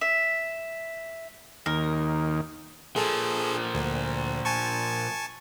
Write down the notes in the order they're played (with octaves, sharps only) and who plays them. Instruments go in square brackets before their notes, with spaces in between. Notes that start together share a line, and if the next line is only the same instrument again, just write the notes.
[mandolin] E5
[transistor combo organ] D#2 [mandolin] A#4
[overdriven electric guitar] A#2 F3 [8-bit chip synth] G#4 A4
[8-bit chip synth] D2
G#5 A5 C#6